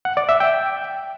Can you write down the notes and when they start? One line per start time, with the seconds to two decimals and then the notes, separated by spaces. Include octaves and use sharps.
0.05 F#5
0.17 D5
0.29 E5
0.40 G5